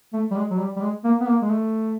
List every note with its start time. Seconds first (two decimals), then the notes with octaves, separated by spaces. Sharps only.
0.13 A3
0.31 G3
0.36 G#3
0.50 F#3
0.58 G3
0.76 G3
0.82 G#3
1.04 A#3
1.20 B3
1.28 A#3
1.42 G#3
1.50 A3